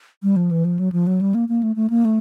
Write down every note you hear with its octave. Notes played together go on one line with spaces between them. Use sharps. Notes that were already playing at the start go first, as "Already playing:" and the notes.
G3
F3
E3
F3
F#3
F3
F#3
G3
A#3
A#3
A3
A3
A#3
A3